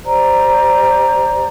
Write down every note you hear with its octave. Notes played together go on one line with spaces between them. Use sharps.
G4 C5 D5 A#5